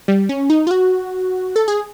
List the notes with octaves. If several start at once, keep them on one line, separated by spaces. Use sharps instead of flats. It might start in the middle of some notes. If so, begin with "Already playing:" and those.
G3
C#4
D#4
F4
F#4
A4
G#4